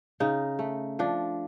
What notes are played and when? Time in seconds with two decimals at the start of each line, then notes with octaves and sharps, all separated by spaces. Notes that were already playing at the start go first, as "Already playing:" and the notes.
0.20 C#3 D#4
0.59 A3
0.99 F3 D4